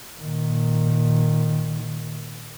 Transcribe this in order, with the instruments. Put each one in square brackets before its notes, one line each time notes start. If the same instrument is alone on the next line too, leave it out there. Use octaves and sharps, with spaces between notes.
[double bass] A#2 D#3